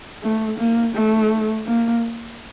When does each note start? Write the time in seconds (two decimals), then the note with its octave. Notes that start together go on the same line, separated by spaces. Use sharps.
0.23 A3
0.58 A#3
0.95 A3
1.66 A#3